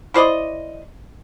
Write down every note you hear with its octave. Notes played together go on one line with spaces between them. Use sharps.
E4 C5 D5 D#5